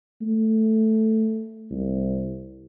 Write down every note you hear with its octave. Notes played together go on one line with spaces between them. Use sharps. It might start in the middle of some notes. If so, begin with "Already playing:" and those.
A3
C2